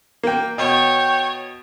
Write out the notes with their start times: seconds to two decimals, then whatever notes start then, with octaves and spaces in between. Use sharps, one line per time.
0.23 A#3 G5
0.58 B2 C#5 G5